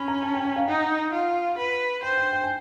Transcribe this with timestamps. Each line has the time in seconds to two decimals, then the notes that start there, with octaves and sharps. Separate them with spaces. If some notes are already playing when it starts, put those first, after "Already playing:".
Already playing: C#4 B5
0.08 A#5
0.23 A5
0.34 G5
0.45 G5
0.56 F5
0.68 D#4 F#5
1.12 F4
1.58 B4
2.02 C5 G5
2.17 G5
2.33 G5
2.44 G#5